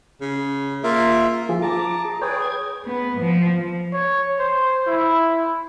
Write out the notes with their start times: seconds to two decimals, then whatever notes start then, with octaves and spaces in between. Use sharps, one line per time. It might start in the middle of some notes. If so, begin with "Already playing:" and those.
0.21 C#3
0.84 A#3 F4 E5
1.49 F3 F4 G#4
1.62 A5 A#5 D6
2.05 G#4
2.22 G#4 B4 C#5 G5
2.42 G#6
2.85 B3
3.20 F3
3.93 C#5
4.39 C5
4.87 E4